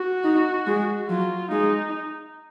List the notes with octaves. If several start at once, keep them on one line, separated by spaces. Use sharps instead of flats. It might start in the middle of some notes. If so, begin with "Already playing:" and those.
Already playing: F#4
D#4
G#3
F#3 F4
G#3 D#4